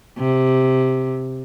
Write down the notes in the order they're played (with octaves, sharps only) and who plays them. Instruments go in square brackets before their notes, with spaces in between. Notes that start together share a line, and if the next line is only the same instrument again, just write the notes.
[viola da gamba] C3